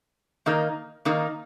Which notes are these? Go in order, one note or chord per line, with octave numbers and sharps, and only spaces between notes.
D#3 A#3 D#4 A#4
D#3 A#3 D#4 A#4